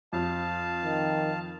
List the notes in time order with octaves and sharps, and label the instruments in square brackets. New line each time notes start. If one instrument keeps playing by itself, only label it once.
[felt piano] F2 [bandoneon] F5 A5
[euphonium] D#3